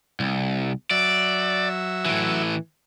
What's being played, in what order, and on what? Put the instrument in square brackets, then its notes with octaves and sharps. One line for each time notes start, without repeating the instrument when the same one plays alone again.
[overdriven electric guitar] C2
[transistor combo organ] F#3 E5 [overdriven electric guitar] D5
[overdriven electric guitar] A2 E3